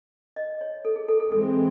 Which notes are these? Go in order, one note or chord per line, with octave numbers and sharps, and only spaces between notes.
D#5
C#5
A4
G#4
A4
A4
E3 G#3 C4 A4